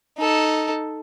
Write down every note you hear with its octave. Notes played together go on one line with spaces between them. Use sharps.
D#4 A4